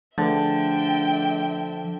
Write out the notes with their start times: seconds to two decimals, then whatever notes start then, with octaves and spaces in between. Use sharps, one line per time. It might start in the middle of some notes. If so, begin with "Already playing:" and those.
0.18 D3 F3 A3 G#4 B4 E5 G5